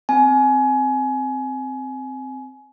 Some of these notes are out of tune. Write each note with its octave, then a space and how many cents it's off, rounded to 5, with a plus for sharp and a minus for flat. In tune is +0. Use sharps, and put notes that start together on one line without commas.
C4 -5 G#5 +25